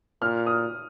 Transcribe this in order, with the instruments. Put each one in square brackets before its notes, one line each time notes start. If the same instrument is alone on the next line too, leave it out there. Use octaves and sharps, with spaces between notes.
[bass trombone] A#2 [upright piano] F6
[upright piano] D#6